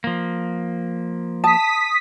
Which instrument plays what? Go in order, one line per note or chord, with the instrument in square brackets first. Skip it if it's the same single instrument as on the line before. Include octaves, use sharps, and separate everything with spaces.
[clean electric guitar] F3 A#3
[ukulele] A5 [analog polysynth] D#6 B6